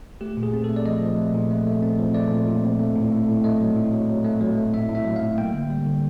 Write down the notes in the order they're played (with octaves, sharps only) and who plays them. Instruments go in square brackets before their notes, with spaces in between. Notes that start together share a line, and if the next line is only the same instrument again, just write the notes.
[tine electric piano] A3 G4
A#2
G#4
C4
A3 A4
D5
F3 D#5
F3
A3
A#2
A3
A3
C4
F3
A3 D5
A#2
A#2
C4
A3
A2
A3
A2
A3 D#5
F#3
A2
F#3
F#3
A3
F#3
A3
A2 E5
A2
E5
F#3
F5
A2
A#3 G5
D3
G3
D3